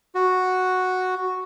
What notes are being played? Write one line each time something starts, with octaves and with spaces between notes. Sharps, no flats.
F#4